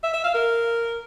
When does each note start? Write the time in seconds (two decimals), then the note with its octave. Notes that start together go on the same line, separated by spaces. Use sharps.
0.03 E5
0.14 E5
0.24 F5
0.34 A#4